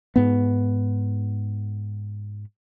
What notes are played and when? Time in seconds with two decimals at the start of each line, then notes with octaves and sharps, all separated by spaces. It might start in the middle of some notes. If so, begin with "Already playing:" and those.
0.16 G#2 B3